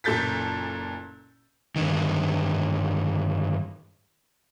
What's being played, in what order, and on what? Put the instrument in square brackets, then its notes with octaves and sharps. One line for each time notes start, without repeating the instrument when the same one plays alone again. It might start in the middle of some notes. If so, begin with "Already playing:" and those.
[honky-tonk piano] F#1 A#2 A4 G6 A6 B6
[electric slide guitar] G2 D3 D#3